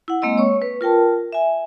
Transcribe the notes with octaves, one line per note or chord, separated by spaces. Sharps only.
E4 F#5
G#3 A#3 C4 D#5 E6
C#5 C#6
B4
F4 A#4 G5 A5
E5 G#5